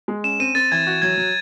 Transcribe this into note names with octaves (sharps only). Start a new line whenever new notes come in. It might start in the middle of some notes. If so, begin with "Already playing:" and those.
G#3
C#4 E7
C4 D#7
C4 A6
E3 G#6
F#4
F#3 G#6
F#3